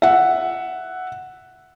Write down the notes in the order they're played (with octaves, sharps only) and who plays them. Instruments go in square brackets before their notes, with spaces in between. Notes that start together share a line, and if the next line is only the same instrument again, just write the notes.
[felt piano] E5 F#5